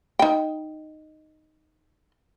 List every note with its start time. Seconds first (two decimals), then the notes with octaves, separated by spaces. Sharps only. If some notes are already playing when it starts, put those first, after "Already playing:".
0.19 D#4 G5